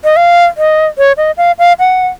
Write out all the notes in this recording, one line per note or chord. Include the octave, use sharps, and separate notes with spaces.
D#5
F5
D#5
C#5
D#5
F5
F5
F#5